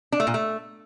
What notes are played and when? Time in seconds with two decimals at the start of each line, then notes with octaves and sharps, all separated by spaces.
0.12 D4
0.20 A3
0.27 A#2
0.34 A3